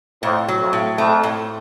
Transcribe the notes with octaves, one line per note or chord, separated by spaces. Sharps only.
F2 A2
F#3
F2
A2
F2 A3
A2